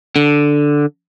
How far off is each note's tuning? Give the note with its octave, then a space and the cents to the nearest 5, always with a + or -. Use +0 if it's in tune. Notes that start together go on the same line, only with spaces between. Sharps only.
D3 +0